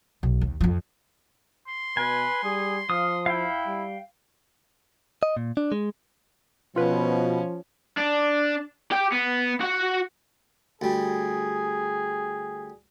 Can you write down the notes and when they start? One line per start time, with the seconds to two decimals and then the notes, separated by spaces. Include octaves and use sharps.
0.23 B1
0.41 D#2
0.61 F2 F3
1.68 C6
1.97 B2 B4 G#5
2.43 G3 G#4
2.90 F3 F5 D#6
3.26 E4 F5 G5
3.67 G3
5.23 D#5
5.37 A#2
5.57 D4
5.72 G#3
6.76 B2 F3 C#4 F4 B4
7.97 D4
8.91 G4 G5
9.12 B3
9.61 F#4 F#5
10.82 D2 G3 G#4